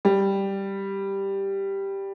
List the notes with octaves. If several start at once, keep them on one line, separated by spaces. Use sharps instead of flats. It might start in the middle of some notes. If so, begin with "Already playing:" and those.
G3